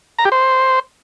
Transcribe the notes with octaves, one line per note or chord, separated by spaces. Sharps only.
A#5
G4
C5